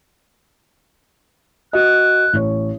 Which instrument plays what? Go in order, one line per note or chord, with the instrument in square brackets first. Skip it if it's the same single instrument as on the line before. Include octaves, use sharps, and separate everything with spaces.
[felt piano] F#4 D#5 [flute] F#6
[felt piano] A1 C#5